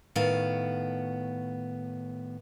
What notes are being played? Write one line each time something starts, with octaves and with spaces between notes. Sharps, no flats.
A2 D#3 B3 F5